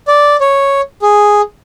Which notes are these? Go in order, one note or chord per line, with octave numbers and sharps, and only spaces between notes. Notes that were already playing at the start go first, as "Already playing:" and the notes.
D5
C#5
G#4